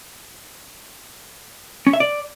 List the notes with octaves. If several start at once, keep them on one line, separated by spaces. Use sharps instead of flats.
C#4
E5
D5